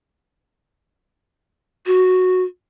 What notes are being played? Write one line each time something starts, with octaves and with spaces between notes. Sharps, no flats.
F#4